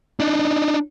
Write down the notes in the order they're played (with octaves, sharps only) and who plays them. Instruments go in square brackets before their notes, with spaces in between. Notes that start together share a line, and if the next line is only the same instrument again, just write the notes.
[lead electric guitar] D4 D#4